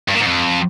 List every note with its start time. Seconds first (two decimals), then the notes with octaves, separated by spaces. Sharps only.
0.08 G2
0.14 A#2
0.21 G#2
0.27 F2